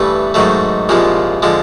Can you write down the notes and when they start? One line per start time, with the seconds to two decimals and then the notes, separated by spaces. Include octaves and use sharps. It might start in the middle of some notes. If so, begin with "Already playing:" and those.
Already playing: G2 E3 A3 B4
0.34 G#2 D#3 F#3 A3
0.89 C2 A#2 F3 G#3
1.42 D3 F3 G#3